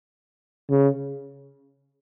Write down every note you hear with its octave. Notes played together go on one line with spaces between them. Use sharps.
C#3